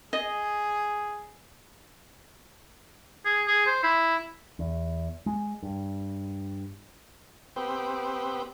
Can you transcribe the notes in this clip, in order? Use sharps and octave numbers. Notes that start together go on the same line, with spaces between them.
G#4 D#5
G#4
G#4
C5
E4
E2
G#3
G2
B3 C4 G4